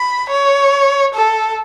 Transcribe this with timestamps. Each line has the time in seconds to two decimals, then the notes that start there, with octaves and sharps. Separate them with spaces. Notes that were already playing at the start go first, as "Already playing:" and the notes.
Already playing: B5
0.29 C#5
1.14 A4